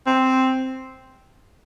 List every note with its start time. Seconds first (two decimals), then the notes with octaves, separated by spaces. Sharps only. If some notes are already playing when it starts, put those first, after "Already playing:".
0.06 C4